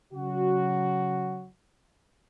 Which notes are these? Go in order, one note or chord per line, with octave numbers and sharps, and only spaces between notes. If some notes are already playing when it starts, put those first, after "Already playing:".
C#3 F#3 F#4